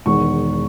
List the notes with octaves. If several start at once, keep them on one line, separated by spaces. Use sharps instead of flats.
E1 E2 D#3 C#6